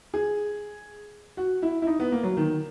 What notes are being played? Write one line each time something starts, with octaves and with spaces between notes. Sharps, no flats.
G#4
F#4
E4
E4
D#4
B3
A#3
F#3
D#3